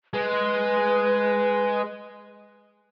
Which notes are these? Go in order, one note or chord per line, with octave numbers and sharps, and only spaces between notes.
G#3 B4